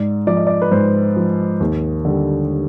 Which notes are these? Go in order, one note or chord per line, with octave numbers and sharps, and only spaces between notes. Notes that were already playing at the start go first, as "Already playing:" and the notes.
Already playing: G#2 D5
F3 D5
D#5
D5
B4
G#2 C5
F3
D#2
D3 G3